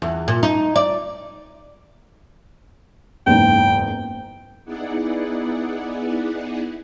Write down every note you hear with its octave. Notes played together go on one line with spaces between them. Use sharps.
E2
A#2
D#4
D5
F#1 E2 G#2 G5
B3 D#4 E4 G#4 D5 F#5